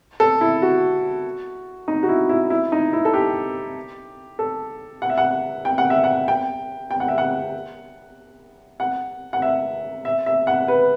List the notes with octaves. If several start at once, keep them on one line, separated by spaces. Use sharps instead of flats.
A4
E4
F#4
D#4
F#4
E4
E4
E4
D#4
E4
A4
G4
A4
F#5
E5
F#5
G5
F#5
E5
F#5
G5
G5
F#5
E5
F#5
F#5
F#5
E5
E5
E5
F#5
B4